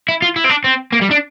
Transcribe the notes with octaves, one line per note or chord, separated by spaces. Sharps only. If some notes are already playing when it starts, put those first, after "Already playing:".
E4
F4
E4
C4
D4
C4
A#3
G3
D4